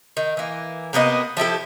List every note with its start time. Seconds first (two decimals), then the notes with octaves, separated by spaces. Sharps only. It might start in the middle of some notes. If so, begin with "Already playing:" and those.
0.17 D#3
0.37 E3 A#3
0.93 C3 A#3 B3 D#5
1.37 F3 E4 G4 A4